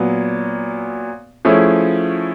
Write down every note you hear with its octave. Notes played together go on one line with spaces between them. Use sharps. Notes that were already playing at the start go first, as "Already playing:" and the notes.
Already playing: A#2 F#3 B3
F3 A3 C#4 E4 G#4